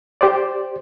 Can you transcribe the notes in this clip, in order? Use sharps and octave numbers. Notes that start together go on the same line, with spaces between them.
G4 C5 D5